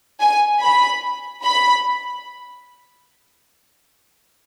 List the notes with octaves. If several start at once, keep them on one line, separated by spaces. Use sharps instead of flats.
G#5
B5
B5